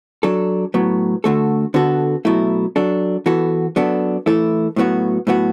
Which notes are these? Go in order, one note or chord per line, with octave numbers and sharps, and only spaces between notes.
F#3 D4 A4
A2 F#3 B3
D3 A3 F#4 A4
D3 B3 F#4 A4
B2 F#3 A3 E4
F#3 D4 A4
E3 B3 F#4 A4
F#3 B3 D4 A4
E3 A3 E4 A4
A2 F#3 B3 F#4
A2 F#3 B3 F#4